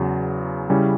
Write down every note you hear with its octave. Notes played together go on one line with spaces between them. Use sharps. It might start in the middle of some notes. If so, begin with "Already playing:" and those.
Already playing: E2 C#3 F#3
C#3 G3 C#4 E4